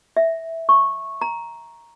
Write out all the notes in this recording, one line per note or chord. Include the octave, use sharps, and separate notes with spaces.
E5
C#6
A#5